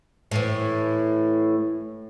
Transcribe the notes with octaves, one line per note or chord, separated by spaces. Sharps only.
A2 E3